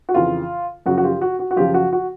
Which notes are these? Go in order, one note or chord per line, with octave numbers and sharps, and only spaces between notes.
F#4
F2 C#3 E3 F4
F#2 C#3 F3 F#4
F#4
F4 G4
F#4
F#4
F#4
F#2 C#3 F3 F4 G4
F#4
F#4